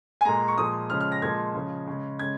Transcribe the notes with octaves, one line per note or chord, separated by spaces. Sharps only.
G#5
A#2 G#3 A#5
C#6
A#2 F3 G#3 D#6
C#3 F3 G#3 F6
F6
A#6
A#2 F3 G#3 G#6
C#3 F3 G#3
C#3 G#3
C#3 G#3 G#6